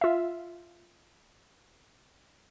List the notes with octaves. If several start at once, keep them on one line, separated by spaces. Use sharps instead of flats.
F4 E5